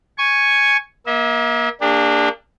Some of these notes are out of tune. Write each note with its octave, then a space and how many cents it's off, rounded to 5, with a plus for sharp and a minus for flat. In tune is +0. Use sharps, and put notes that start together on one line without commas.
G#5 +0 C#6 +0
A#3 +30 E5 -35
A#3 -20 D4 +0 G4 +45